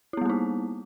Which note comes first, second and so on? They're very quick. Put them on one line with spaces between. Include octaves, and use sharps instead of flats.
E4 B3 G3 A#3 D#4